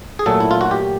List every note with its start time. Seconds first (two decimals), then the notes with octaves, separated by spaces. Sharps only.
0.19 G#4
0.26 A#2 F#3 A3 A4
0.40 E4
0.51 F4
0.61 F#4
0.71 G4